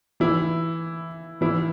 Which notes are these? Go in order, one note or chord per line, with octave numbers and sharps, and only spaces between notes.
E3 E4
E3 E4